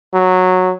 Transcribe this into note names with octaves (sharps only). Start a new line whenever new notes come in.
F#3